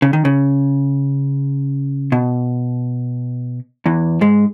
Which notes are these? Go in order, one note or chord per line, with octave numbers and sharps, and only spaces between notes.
C#3
D#3
C#3
B2
E2 E3
G#2 G#3